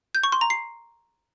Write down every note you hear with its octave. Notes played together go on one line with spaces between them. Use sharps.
G6
C#6
C6
A#5
C7